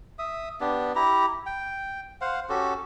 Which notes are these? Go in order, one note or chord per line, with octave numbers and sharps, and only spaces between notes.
E5 D#6
B3 D4 G4
E4 G4 A#5
G5
C5 F5 F#5
C#4 F#4 G4 A4